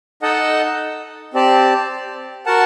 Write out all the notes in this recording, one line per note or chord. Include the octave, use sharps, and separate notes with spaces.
D#4 A4 D#5 F#5 A5
C4 G4 D5 A5
F#4 A#4 F#5 A5